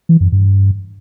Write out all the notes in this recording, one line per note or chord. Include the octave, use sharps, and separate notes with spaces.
E3
F#2
G2